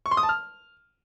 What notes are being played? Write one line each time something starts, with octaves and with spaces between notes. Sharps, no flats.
C#6
C6
D#6
A5
F6